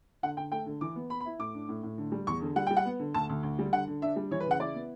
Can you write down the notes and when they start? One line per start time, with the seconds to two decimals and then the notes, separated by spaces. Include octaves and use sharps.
0.23 D3 F#5
0.37 D3 G5
0.52 A3 G5
0.66 D3
0.81 E3 D6
0.96 B3
1.10 B3 B5
1.21 B5
1.25 E4
1.39 A2 D6
1.54 D4
1.69 A2
1.83 A2
1.98 D3
2.12 G3
2.27 E2 C#6
2.41 D3
2.56 G3 F#5
2.67 G3 G5
2.77 F#5
2.85 B3
3.00 D3
3.14 D2 A5
3.29 D2
3.43 D2
3.59 G3
3.72 D3 F#5
3.88 D3
4.02 D4 E5
4.16 G3
4.31 E3 C#5
4.40 B4
4.46 C#3 F#5
4.60 E4 D5
4.75 B3